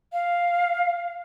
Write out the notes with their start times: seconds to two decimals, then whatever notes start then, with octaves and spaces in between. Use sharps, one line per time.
0.13 F5